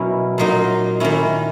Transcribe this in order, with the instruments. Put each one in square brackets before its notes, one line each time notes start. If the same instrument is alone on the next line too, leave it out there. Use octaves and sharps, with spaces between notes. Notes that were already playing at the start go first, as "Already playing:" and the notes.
Already playing: [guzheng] B2 F#3 C#4 E4 A#4
A#2 F#3 A#3 D#4
D#3 A#3 C#4 E4